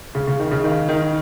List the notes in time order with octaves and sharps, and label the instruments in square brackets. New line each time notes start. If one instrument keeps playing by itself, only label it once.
[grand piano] C#3
C#3
D#3
C#3
D#3
D#3